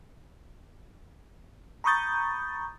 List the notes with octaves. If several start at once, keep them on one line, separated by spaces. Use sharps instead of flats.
A#5 B5 C#6 D#6 G6 A6